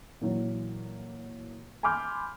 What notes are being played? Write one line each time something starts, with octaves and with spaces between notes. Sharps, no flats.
A#2 E3 F#3
G#5 B5 C6 D6 F6 G6